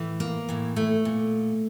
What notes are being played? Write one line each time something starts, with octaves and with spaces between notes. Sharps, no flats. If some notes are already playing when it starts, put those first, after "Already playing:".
Already playing: A2 E3
A#3
A2 E3
A3
A#2